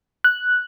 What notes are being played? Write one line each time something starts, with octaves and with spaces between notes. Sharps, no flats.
F#6